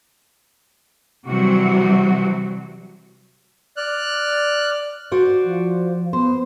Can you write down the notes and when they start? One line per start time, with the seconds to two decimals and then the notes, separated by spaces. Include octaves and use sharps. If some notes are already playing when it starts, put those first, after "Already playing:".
1.26 C3 E3 F#3 G3 C4 F#4
3.77 D5 F6 F#6
5.12 F#4 C5 D5
5.45 F3
6.13 B3 C5